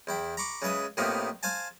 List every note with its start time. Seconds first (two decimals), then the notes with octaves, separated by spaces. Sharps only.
0.07 E2 E4 G5
0.37 A#5 B5 C#6 D6
0.62 C#3 G#3 B4 E5 D#6
0.97 A2 C3 A#3 B3 D#4 F4
1.43 C5 F5 G#5 A5